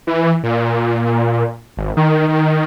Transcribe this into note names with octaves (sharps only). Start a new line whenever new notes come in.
E3
A#2
G#1
D#3
D#3